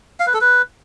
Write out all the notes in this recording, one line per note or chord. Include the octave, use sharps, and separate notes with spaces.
F5
B4
A4
B4